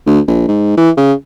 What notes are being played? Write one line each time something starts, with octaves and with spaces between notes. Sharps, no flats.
D2
A#1
G#2
E3
C#3